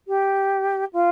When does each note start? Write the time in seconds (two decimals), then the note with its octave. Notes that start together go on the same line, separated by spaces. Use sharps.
0.08 G4
0.93 F4